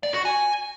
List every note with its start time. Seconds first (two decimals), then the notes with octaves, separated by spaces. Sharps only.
0.03 D5
0.14 F#4
0.25 G#5